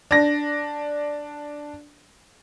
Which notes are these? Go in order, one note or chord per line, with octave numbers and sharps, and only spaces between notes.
D4 A#6